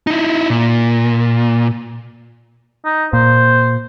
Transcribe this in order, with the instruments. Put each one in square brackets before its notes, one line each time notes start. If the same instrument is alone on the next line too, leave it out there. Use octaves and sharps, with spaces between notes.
[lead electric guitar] D#4 E4
A#2
[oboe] D#4
[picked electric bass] A#2 [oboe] C5